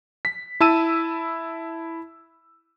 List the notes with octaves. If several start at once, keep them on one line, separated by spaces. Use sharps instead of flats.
B6
E4 A5 E6 D#7